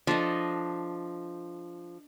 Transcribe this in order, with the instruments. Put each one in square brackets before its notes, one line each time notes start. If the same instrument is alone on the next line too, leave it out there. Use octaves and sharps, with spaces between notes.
[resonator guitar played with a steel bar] F3 [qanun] D4 A4 D#5